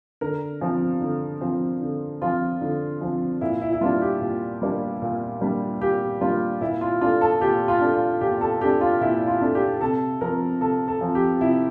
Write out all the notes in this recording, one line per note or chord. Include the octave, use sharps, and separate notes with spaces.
D3 A#4
F3 C4
D3
F3 C4
D3
F3 C4 F4
D3
F3 C4
A#2 E4
E4
E4
G3 A#3 D4 F4
G4
A#2
G3 A#3 D4
A#2
G3 A#3 D4
A#2 G4
G3 A#3 D4 F4
A#2 E4
F4
A3 D4 F4
A4
A#2 G4
F4
A3 D4
F4
A#2 G4
A4
A3 D4 G4
F4
A#2 E4
F4
A3 D4
G4
C3 A4
F3 C4 A#4
C3 A4
A4
F3 C4
G4
C3 E4